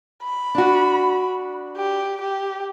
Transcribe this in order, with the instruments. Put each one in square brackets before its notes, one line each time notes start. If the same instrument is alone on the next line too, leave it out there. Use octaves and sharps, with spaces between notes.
[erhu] B5
[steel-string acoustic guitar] D4 F#4
[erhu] G4
G4